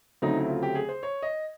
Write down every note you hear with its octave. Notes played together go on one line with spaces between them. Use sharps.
D2 C#3 F#3 A3 C4 D#4
E4
F4
G4
G#4
C5
C#5
D#5